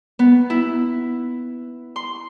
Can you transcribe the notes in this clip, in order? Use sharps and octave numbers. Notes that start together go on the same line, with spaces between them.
B3
E4
C6